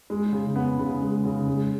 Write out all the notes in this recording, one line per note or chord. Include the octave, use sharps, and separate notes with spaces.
G#3
C#3
B3
C#3
G#3
C#3
G#3